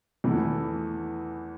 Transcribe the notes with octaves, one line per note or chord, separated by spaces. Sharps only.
E2 E3 A3